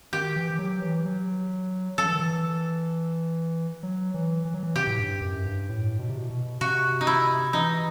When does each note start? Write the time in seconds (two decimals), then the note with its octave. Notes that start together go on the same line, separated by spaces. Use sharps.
0.13 D#3 G4
0.36 E3
0.50 E3
0.59 F#3
0.82 E3
1.05 F#3
1.98 F#3 A4
2.06 E3
2.13 D#3
2.20 E3
3.83 F#3
4.14 E3
4.45 E3
4.54 F#3
4.63 E3
4.76 C3 G4
4.87 A2
4.99 G2
5.22 F#2
5.45 G2
5.69 A2
5.99 B2
6.09 C3
6.17 B2
6.30 B2
6.61 C3 F#4
7.01 D#4
7.07 E4
7.53 E3 D#4